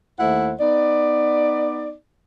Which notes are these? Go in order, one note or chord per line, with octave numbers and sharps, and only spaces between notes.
D#2 A3 E4 C5 F#5
B3 D#4 D5